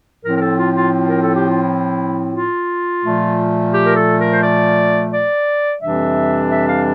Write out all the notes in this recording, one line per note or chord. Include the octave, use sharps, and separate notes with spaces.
A2 F3 C4 A#4
A#4
A4
F4
F4
F4
A#4
A4
G4
F4
E4
F4
A#2 F3 A3
G4
A#4
A4
A#4
C5
D5
D5
F2 C3 E3 G3 D4 E5
E5
F5